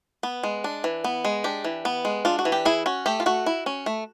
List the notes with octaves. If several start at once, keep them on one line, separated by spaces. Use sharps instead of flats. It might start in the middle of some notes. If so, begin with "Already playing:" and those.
B3
G#3
D4
E3
B3
G#3
D4 G4
E3
B3
G#3
D4 F4
F#4
E3
G4
E4 G#4
C#4 F#4
A3 G4
F4
A3 F#4
E4
C#4
A3